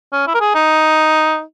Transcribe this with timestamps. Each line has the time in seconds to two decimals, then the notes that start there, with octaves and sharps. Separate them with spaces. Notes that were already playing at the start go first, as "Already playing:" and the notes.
0.12 C#4
0.27 E4
0.34 A#4
0.40 G#4
0.55 D#4